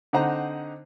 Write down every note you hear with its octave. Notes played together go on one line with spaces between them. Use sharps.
D3 C4 D#4 C5 F#5 A#5